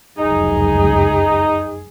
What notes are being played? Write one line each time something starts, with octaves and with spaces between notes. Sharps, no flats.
F1 C#2 F#2 D#4 G#4